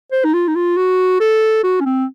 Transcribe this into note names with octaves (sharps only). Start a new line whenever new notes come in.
C5
D#4
F4
D#4
F4
F#4
A4
F#4
C#4
C4